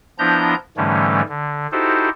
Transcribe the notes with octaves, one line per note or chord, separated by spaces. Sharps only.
F3 B3 D4 E4 A#5 G6
G#2 D3 E3 G3 A3 C#4
D3
D#4 E4 F#4 G4 A4 C5